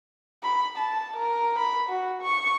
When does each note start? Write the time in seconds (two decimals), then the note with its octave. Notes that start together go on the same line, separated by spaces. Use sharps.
0.43 B5
0.77 A5
1.17 A#4
1.59 B5
1.90 F#4
2.22 C#6